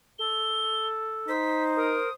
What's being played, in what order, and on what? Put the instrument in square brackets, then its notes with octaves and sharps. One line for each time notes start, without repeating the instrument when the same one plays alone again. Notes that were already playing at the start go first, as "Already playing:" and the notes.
[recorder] A4 [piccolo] G7
[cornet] D#4 [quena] C5 [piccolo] B6
[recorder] A#4 [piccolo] D#6